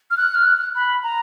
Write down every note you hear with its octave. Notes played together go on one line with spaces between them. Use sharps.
F6
F#6
F6
F#6
B5
A#5